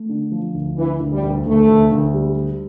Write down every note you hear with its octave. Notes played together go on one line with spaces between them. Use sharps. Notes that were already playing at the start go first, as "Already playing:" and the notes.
Already playing: A3
D3
F3
D2
D3 E3
D2
G3
D2
D2 A3
D2
D2
G3
G3